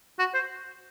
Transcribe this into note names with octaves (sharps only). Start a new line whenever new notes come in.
F#4
C5